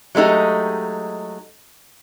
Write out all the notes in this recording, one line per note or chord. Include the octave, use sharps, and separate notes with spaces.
F#3 G#3 A3 D#4 G4